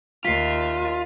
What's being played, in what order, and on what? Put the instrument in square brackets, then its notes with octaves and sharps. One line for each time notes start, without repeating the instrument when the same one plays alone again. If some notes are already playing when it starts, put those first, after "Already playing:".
[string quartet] D#2 E5 [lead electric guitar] F4 [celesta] B6 C7